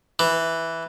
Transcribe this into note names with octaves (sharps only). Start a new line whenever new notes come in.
E3